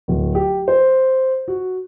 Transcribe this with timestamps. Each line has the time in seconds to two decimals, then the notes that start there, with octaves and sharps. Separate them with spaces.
0.08 D1
0.35 G4
0.68 C5
1.48 F#4